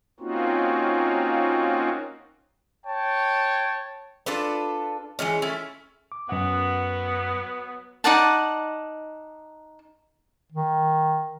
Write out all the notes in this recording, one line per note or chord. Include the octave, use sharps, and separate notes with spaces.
A#3 C4 C#4 D#4 F4 F#4
C#5 G5 A5
D4 F4 A4 B4
E3 G3 G#3 C#4
A3 C#4 E4
D6
F#2 F#3 B3 F#5
D#4 D5 F#5 A5
D#3